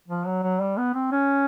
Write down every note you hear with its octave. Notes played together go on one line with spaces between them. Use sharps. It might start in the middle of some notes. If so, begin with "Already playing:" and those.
F3
F#3
F#3
G3
B3
C4
C#4